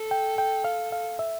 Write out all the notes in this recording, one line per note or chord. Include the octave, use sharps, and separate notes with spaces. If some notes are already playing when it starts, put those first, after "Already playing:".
Already playing: A4
G5
G5
F5
F5
E5